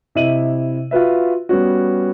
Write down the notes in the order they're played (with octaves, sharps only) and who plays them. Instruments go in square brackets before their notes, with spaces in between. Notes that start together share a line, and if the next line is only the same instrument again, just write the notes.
[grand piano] C3 E4 D#5 E5 D#7 F#7
F4 F#4 B4 E5
G3 B3 C#4 F#4